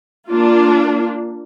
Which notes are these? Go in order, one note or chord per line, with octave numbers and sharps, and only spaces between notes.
A#3 D4 F4